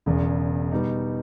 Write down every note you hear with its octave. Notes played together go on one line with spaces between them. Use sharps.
E1 E2 C#3
B2 G3 B3 D#4